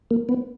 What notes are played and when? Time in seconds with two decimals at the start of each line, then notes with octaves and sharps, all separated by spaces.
0.11 A#3
0.29 B3